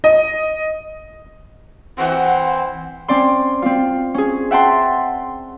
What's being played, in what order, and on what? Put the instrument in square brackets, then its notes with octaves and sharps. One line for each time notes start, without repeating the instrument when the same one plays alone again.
[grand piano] D#5
[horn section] E3 C4 [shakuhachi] F#5
[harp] C4 C#4 D5 C6
C4 F4
C#4 G#4
E5 F#5 G5 A5 C6